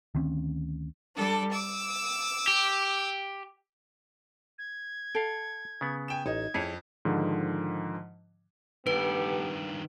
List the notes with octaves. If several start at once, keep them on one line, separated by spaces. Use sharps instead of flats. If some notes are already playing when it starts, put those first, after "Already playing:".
D2 D#3 C4 C#4
G3 D4 A4
D6 E6
G4
G#6
A4 F5 G5
C#3 B3
G5 G#5 E7
A1 D#4 G#6
F2 E4 G#4 C#5
G#2 D3 D#3 F3
G2 D#3 A3 B3 G4 B4